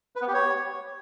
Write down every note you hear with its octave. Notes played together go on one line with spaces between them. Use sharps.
B4
B3
G4
C#5